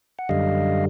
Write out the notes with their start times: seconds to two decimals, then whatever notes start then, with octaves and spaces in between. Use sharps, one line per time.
0.19 F#5
0.29 F#2 D3 G3 D#5 F5